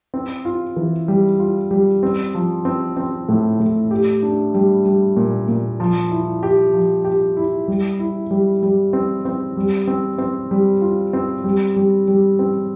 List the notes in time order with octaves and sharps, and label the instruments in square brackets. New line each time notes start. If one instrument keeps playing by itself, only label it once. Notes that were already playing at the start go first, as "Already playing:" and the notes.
[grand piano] C4
F4
E3
G3
F4
G3
C4
F3
C4
C4
A2
A2
G4
D4
G3
G3
A#2
A#2
F3
E4
G4
F3
G4
E4
G3
E4
G3
G3
C4
C4
G3
C4
C4
G3
F4
C4
G3
G3
G3
C4